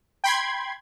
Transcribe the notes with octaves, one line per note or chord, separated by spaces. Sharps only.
G5 B5 C6 G#6